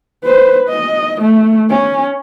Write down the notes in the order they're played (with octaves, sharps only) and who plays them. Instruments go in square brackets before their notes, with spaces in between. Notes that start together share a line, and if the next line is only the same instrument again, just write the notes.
[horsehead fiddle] B4 C5
D#5
A3
C#4